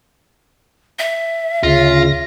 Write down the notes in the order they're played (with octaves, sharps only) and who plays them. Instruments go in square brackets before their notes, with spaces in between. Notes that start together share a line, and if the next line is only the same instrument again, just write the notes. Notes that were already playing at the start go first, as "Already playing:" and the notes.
[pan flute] E5
[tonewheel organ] D2 A#6 [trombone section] C#3 [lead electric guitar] F4